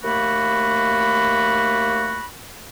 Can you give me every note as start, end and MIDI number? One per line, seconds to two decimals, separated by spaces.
0.03 2.25 39
0.03 2.25 57
0.03 2.25 58
0.03 2.25 66
0.03 2.25 83